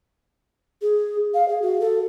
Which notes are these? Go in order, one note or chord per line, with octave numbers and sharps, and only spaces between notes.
G#4
F5
G#4
F#4
A4